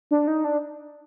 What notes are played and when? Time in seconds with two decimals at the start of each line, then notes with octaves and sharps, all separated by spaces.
0.11 D4
0.27 D#4
0.44 D4